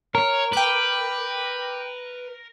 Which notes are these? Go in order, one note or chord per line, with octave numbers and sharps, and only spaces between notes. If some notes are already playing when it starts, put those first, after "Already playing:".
A#4 C#5
B4 G5 D6